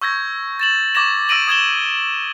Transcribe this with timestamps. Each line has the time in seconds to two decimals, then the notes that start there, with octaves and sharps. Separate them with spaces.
0.01 C#6 E6 G6 G#6 A#6
0.60 A6 E7 F#7
0.95 C#6 D6 G#6 A#6 E7
1.29 D6 E6 A#6 D7 D#7 F#7
1.48 D#6 G#6 E7 G7